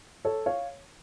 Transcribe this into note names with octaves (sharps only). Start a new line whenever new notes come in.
A4 C#5
C#5 F5